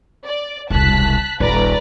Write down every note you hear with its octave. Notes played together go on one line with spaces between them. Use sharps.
D5
E1 C2 A5 F#6 B6
D#1 A#1 B4 D5 A#5